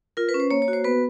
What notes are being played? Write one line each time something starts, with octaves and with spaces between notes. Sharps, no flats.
F4 A#4
B4
C#4
C5
A#3 C#5
C#5
F#4
C5
B3 B4